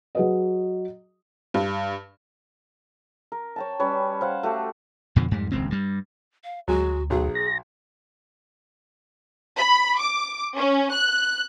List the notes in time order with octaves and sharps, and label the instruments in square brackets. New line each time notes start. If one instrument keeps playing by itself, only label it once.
[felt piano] F#3 F#4 G#4 B4 D#5
[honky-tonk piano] G2
[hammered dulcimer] A#4
C#5 G5 A5
G3 C#4 B4 C#5
C5 F5 F#5
A3 F#4 G4 A4
[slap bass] F2 B2 D3 F3
F2 G#2 G3
D#1 C#2 G#2 C4
G2 G3
[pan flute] F5
[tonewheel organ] D2 [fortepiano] F#3 G#3 [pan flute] F#4
[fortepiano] B1 F#3 [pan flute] G#4
[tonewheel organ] A#6
[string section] B5
D6
C#4
F#6